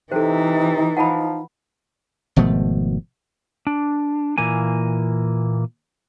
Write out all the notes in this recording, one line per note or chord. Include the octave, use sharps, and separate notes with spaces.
C3 E3 D#4 A4 C5
F3 F#5 A5 B5
G#1 B2 F3 A3
D4
A#2 E3 A#3 G#5